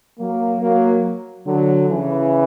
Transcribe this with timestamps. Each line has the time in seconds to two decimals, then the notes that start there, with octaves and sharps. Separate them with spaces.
0.18 F#3 A#3
0.60 F#3 A#3
1.46 D3 F#3
1.88 C#3 E3